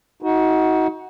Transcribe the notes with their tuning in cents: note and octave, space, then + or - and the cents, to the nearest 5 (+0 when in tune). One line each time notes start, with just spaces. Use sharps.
D#4 +30 F#4 +0